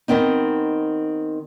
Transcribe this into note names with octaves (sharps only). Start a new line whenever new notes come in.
D#3 B3 C4 D#4